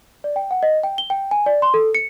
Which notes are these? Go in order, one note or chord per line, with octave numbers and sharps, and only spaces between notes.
D5
G5
F#5
D#5
G5
G7
G5
G#5
D5
C6
A4
C#7